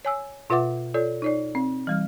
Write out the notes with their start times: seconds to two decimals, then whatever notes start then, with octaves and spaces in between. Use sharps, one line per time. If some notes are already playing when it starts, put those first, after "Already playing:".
0.05 C#5 G#5 E6
0.50 B2 F4 B4 E5 F#5 D6
0.94 F4 A4 C#5 D5
1.22 D#4 C#5 D5
1.55 C4
1.87 E3 G3 F6